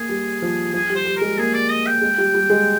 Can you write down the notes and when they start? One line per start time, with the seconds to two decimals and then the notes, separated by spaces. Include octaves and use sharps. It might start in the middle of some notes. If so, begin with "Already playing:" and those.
Already playing: A#3 G#4
0.09 G3
0.42 F3
0.73 F3 G#4
0.90 G3
0.95 C5
1.05 G3
1.17 G#3 A#4
1.38 A#3 G#4
1.54 D5
1.70 D#5
1.87 G5
2.01 G#3
2.18 G3
2.35 G3
2.50 G#3